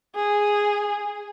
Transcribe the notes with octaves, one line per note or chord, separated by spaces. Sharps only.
G#4